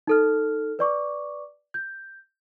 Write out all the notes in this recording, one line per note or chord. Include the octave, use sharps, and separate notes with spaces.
D#4 A4 F6
B4 D5 C#6 D6
G6